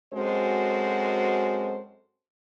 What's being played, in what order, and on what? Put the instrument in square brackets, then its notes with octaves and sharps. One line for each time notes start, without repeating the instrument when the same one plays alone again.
[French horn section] F#2 G#3 C4 F#4 A4 C5